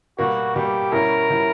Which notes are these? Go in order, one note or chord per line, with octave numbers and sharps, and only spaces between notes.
B2 G3 A#3 F#4
B2 G3 A#3 G4
B2 G3 C#4 E4 A#4
B2 G3 C#4 E4